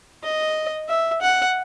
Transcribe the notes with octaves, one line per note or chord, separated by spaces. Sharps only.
D#5
E5
F#5